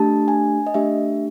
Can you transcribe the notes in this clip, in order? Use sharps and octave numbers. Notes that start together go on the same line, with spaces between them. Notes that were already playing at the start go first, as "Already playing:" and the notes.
Already playing: A3 D4 G4 A5
G#5
D#5
A3 D4 G4 E5